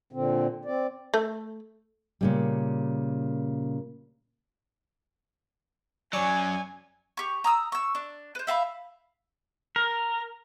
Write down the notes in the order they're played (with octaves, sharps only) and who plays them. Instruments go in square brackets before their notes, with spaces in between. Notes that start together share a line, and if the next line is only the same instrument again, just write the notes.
[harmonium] A#2 D3 C4
C4 D5
[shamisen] A3
[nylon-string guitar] A#2 C#3 G3
[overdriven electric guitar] F#2 F#3 [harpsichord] C#5 D5 A5 [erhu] G#5
[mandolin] G4 C#6
A#5 D#6 E6
C#6 E6
D4
B4 C5
E5 F5 A5 B5
[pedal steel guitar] A#4